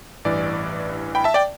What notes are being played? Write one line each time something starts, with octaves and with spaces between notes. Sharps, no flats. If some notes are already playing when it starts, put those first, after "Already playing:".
A1 G2 E3 D5
G5 B5
E5 A5
D5 G5